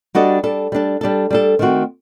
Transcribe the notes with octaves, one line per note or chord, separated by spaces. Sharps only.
G3 D4 F#4 A4 D#5
G3 D4 A4
G3 D4 A4
G3 D4 A4
G3 D4 A4
D#3 A3 C4 F#4